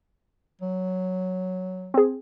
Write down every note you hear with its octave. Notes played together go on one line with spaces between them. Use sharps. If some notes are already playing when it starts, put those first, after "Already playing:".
F#3
C4 G#4